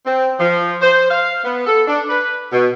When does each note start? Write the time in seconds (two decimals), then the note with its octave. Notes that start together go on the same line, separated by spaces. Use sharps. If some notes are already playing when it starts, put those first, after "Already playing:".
0.06 C4
0.39 F3
0.81 C5
1.10 F5
1.44 B3
1.66 A4
1.87 D4
2.09 B4
2.52 B2